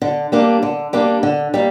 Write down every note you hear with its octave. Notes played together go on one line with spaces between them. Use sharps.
D3
G3 A#3 D4
D3
G3 A#3 D4
D3
G3 A#3